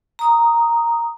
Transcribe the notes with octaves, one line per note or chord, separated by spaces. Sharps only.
A#5 D#6